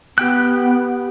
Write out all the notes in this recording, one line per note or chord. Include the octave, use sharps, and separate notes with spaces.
B3 G4 G5 F#6